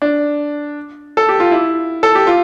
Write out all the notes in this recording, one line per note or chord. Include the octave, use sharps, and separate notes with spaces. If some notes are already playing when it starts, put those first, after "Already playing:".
D4
A4
G4
F4
E4
A4
G4
F4